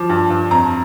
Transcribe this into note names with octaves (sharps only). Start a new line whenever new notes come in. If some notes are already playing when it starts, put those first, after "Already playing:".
Already playing: F3 D6
G2
G2
F2 A#5